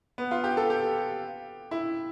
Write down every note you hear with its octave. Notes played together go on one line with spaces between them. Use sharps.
B3
F4
G4
A4
G4
E4